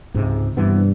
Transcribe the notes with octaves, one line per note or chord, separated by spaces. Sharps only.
C#2 G#2 C3
G2 C3 E3 B3